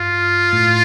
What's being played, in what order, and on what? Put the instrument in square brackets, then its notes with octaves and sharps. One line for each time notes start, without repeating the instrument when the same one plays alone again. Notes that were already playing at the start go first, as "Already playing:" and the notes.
Already playing: [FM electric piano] G2 [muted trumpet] F4
[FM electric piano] A2